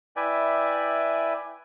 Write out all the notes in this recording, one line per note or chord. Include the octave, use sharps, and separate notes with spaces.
E4 B4 D5 E5 G5 G#5